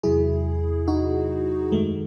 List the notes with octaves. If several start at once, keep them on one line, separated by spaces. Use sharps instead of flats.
E2 C3 F#3 E4 G#4
D#4 F#4
F#2 D#3 G#3 A3